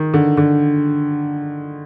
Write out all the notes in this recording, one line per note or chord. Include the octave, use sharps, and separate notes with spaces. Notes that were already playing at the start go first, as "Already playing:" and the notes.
Already playing: D#3
D3
D3